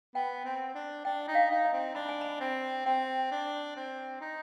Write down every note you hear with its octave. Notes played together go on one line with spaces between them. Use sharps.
B3 G5
C4
D4
D4 G5
D#4
F5
D#4
D#5
C4
D4 B5
G#5
B5
C4
C4 G5
D4
C4
D#4